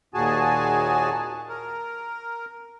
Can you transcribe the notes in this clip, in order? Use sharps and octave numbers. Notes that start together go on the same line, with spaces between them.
D#2 A#2 F#4 G#4 G#5 A5
A#4